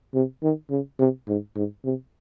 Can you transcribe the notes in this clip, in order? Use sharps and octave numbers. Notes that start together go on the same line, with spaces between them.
C3
D#3
C#3
C3
G#2
G#2
C3